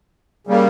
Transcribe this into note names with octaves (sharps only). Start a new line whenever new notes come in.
C#3 G3 A#3